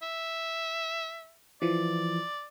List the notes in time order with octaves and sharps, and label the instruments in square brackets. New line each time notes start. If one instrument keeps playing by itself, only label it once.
[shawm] E5
[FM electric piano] E3 F3 [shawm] D5